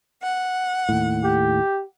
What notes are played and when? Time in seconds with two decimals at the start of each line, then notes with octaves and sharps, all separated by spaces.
0.23 F#5
0.89 D#2 A2
1.24 G4